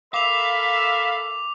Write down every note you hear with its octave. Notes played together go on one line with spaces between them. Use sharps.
A4 A#4 E5 F5 B5 D6 F7